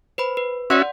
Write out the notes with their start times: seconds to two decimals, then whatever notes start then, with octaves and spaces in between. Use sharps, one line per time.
0.18 B4 C5 B5
0.37 B4
0.70 C#4 F#4 D5 E5 F#5 C6